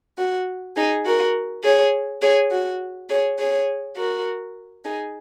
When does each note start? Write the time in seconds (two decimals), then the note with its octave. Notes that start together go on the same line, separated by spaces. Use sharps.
0.18 F#4
0.76 D#4 G#4
1.05 F#4 A#4
1.64 G#4 C#5
2.21 G#4 C#5
2.51 F#4
3.09 G#4 C#5
3.38 G#4 C#5
3.96 F#4 A#4
4.84 D#4 G#4